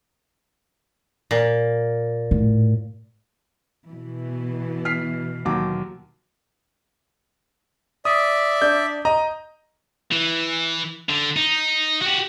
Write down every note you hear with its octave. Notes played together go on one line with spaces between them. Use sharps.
A#2
A2
B2 E3
F6 B6 C7
D#2 F#3 D6
D5 E5 D#6
D4 G6
D#5 A#5
E3
D3
D#4
F#4 G4